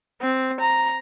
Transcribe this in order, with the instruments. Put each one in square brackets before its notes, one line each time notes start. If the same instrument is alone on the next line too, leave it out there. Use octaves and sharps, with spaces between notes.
[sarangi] C4
A#5